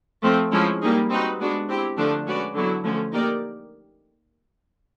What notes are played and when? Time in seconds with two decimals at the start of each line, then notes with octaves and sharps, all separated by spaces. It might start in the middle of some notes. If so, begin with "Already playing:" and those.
0.23 F3 A3 C4
0.51 F3 G#3 C#4 E4
0.81 G3 A#3 D#4 G#4
1.10 C4 D#4 F#4 B4
1.39 G#3 B3 D4 F#4
1.69 C4 E4 G4
1.97 D3 F3 A3 D4
2.25 G#3 C#4 F#4 B4 D5
2.55 D3 F#3 B3 E4
2.84 D3 F3 A3 C#4
3.13 A#3 D#4 G4 A#4 D5